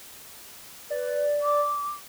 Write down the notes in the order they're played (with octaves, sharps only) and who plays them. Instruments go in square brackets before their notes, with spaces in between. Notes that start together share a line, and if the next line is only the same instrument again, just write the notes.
[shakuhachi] B4 [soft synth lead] D5
[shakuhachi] D6